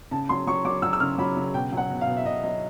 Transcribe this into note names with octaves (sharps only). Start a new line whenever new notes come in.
C#3 A5
F#3 C6
F#3 C#6
F#3 D6
F#3 E6
E6
C#3 F6
F#3 B5
C#3
B2 G5
F#3 F#5
B2
F5
B2
E5
B2 D#5
F#3 D#5